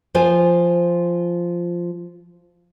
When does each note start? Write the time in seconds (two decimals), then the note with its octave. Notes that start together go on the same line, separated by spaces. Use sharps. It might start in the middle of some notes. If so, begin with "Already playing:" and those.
0.14 F3 F4 C5 G#5